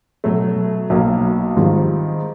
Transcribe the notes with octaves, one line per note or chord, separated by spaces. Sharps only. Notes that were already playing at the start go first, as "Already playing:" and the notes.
B2 F#3 A3
B1 B2 F#3 A#3
G#2 D#3 G3 C4 F4